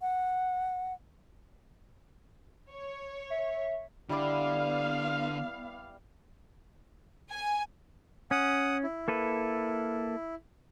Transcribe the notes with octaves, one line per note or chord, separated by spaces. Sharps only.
F#5
C#5
E5
D3 G3 B3 E4 D5 F5
G#5
C#4 F#5 D#6
E4
A#3 A4 B4